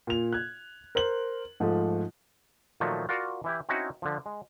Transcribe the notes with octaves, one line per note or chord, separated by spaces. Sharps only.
A#2 F7
F#6 G#6
A#4 C5 F#7
G#2 F3 A3
A#2 D#3 F3 F#3 A3
F4 F#4 A#4 D5
E3 E4 G4
C4 C#4 D#4 E4 F#4
D3 F3
G#3